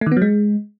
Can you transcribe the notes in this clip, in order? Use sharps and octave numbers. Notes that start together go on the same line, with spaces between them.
A3
D#3
B3
F#3
G#3